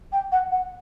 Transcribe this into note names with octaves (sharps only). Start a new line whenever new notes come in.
G5
F#5
F#5